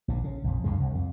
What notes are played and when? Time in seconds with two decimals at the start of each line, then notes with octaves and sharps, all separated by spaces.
0.08 A#1 D3
0.24 C#3
0.44 A#1 F2
0.64 C#2 G2 A#2 G#3
0.80 C2
0.95 F2